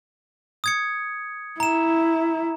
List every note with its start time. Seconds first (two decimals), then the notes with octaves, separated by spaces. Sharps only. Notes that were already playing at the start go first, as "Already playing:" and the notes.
0.64 D#6 G#6 C#7
1.60 E4 A#5 E7